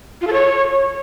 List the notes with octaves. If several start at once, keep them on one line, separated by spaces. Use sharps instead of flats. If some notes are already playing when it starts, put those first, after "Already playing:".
F4
A4
C#5